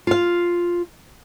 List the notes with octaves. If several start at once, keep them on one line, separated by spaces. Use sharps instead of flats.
F4 F5